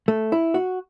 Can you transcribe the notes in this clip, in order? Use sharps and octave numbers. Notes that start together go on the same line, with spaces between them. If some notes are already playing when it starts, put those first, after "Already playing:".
A3
E4
F#4